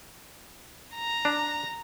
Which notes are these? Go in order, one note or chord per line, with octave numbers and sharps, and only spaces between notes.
A#5
D4